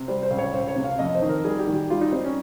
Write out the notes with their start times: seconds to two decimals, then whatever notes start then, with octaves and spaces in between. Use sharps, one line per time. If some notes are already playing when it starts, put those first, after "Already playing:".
Already playing: C3
0.08 G3 C5
0.23 C5
0.31 C#2
0.38 C#5
0.53 C#2 C5
0.68 C#5
0.76 C3
0.84 F5
0.99 F2 D#5
1.15 C5
1.22 D#3
1.29 A#4
1.44 G3 G#4
1.59 G4
1.67 D#3
1.74 G4
1.90 G3 F4
2.01 D#4
2.12 G3 C4
2.24 C#4